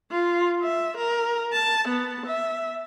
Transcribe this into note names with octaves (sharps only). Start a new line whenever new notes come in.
F4
E5
A#4
A5
B3
E5